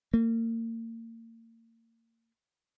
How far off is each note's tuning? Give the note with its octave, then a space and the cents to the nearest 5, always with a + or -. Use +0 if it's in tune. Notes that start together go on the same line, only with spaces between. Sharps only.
A#3 -35